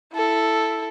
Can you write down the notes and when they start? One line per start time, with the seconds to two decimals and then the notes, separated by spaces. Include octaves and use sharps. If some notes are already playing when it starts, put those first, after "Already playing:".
0.13 E4 A4